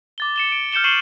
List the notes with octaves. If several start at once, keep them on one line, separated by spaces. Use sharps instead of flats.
D6 A6 G7
C#7 E7 G7
D7
F6 G6 C#7 E7 G7
C#6 F6 C7 D#7 E7 F#7